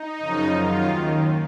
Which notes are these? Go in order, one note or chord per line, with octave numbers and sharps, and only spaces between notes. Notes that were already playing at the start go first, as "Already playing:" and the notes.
Already playing: D#4
F#2 C#3 F3
F#2 D#3 F4
D#2 D#3